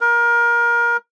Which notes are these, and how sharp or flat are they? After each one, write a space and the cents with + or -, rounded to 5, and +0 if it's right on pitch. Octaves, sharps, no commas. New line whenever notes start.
A#4 +25